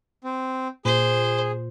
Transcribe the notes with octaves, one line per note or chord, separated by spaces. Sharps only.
C4
A#2 G#4 C5